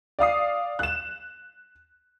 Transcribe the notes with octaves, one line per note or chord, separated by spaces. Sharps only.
D5 F5 D#6 C7
F#6 E7